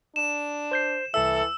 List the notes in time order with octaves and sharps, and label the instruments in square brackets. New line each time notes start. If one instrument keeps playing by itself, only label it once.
[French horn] D4 [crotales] E7
[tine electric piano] C5 G6 C7
[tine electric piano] C2 E5 [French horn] E3 [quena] A4 [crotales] E6